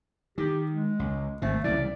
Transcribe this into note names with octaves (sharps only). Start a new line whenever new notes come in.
D#3 G4
G#3
C#2
G#1 C3 A3
C2 C#3 E3 D5